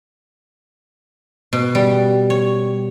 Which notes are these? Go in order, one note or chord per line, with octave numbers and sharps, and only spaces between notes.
B2
G3
C#5